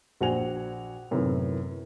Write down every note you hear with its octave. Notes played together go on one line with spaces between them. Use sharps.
A#1 F#4 C5 F#5 G#5 F7
F#2 A2 C3 D#3 B3